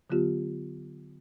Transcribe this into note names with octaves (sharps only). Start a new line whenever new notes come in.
D3 F#3 B3 F4 G4